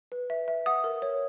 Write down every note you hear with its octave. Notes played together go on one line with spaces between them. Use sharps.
B4
E5
E5
F#5 D#6
A#4
C#5